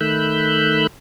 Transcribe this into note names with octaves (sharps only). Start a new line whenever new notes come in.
D#3 A3 B5 E6 F#6 G6